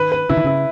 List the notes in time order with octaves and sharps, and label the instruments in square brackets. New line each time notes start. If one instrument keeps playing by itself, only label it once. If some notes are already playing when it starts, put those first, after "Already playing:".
Already playing: [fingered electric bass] D#3 [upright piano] B4
[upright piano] B4
[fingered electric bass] C#3 [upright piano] E4
[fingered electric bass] D#3
[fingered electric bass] C#3 [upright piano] E4